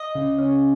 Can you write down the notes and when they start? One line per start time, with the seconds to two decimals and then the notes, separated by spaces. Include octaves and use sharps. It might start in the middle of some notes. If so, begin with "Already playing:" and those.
Already playing: D#5
0.15 C#3
0.38 C#4